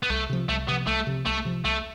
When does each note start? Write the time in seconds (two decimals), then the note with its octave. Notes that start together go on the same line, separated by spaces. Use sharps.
0.03 B3
0.10 C2 A3
0.30 C3 F3
0.49 C2 A3
0.68 C3 B3
0.72 F3
0.87 C2 A3
1.07 C3 F3
1.26 C2 A3
1.45 C3 F3
1.64 C2 A3